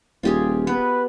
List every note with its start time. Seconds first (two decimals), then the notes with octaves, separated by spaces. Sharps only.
0.23 D#1 F4 G4 G#4
0.67 B3 B4